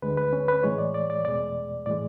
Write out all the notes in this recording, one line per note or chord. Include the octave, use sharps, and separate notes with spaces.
D2 D3 G#3 B4
B4
C#4
B4
A2 E3 G#3 C#5
D5
D5
D5
E2 B2 G#3 D5
A2 E3 G#3 D5